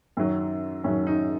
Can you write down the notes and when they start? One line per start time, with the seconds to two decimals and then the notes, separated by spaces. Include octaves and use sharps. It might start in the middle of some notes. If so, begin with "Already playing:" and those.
0.17 F#2 D#3 F#3
0.84 F#2 D#3 F#3 C#4
1.07 D#4